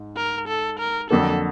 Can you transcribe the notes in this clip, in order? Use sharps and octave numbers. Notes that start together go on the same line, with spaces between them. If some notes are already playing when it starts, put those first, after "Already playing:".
Already playing: G#2
A#4
A4
A#4
F2 D3 F#3 A#3 A4